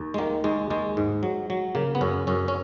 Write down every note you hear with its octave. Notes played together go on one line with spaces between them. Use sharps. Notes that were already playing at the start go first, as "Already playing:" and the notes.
Already playing: D#2
G#3
D#3 A#3
D#2 G#3
D#2 G#3
G#2
F#3
F#3
C#3 A#3
B3
F#2 C#4
F#2 C#4
C#4